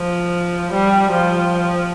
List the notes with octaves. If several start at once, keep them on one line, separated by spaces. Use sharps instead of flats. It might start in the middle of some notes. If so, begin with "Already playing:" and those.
Already playing: F3
G3
F3